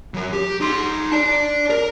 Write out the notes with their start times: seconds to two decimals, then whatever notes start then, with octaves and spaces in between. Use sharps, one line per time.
0.14 F#3 A#4
0.33 G4
0.61 D#4 C6
1.12 D5 A5
1.70 A#4